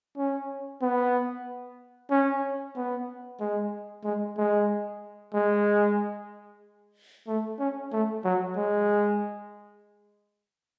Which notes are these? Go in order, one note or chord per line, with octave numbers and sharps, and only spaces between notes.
C#4
B3
C#4
B3
G#3
G#3
G#3
G#3
A3
C#4
A3
F#3
G#3